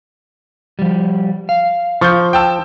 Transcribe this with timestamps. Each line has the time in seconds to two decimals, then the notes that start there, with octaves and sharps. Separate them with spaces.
0.79 F3 G3
1.49 F5
2.01 F3 C#6 G6
2.33 G5 A5 E6